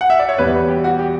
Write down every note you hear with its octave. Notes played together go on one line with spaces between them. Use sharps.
F#5
E5
D5
C#5
E2 B2 G3 B4
G4
F#4
G4